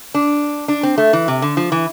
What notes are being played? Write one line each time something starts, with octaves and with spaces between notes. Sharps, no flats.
D4
D4
C4
A3
E3
C3
D3
F3
E3